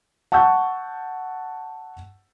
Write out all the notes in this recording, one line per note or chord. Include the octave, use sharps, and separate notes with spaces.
F#5 A5 C#6 E6 G6